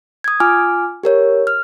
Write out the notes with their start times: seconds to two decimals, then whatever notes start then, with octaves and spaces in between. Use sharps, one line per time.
0.24 D#6 G#6
0.40 F4 G#5 D6 F6
1.03 G4 A#4 C#5
1.47 F6